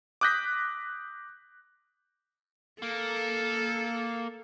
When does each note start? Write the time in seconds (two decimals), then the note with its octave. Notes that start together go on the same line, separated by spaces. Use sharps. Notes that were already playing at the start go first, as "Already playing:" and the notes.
0.21 D6 D#6 F#6 G6 A#6 B6
2.82 A#3 A4